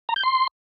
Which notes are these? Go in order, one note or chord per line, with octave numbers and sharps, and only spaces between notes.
A#5
G6
C6